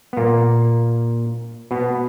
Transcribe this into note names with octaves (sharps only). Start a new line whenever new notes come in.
B3
A#2 A#3
B2 B3